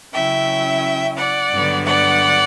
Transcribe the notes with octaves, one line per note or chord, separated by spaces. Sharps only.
C#3 F#3 C#4 E4 E5 G5
D5 F#5
G2 D3 F#3 B3
D5 F#5